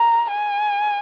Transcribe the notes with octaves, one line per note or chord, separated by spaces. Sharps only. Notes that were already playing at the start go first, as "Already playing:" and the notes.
Already playing: A#5
G#5